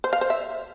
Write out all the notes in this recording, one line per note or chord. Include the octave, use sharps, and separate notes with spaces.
C5
F5
C5
E5